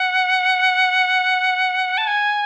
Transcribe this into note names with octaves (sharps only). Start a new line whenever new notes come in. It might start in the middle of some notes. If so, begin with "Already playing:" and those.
Already playing: F#5
A5
G#5